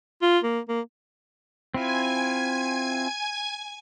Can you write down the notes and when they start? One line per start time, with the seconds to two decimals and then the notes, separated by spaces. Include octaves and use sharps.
0.22 F4
0.44 A#3
0.68 A#3
1.74 C4 E4 F4 G#5 G#6